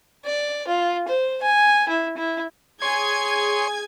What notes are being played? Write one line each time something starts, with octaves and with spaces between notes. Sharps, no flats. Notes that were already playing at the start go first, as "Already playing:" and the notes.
D5
F4
C5
G#5
E4
E4
G#4 C#5 G#5 C6 G#6